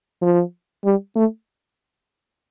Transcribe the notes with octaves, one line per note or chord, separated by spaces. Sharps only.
F3
G3
A3